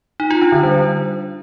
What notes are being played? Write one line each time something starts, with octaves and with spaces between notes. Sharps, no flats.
D#4
F4
D4
D3
G3